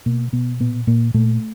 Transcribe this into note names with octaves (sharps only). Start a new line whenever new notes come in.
B2 A#3
B2 B3
A#2 B3
A#2 A#3
A#2 A3